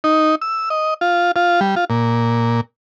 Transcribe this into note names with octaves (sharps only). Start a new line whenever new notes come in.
D#4
E6
D#5
F4
F4
G3
F4
A#2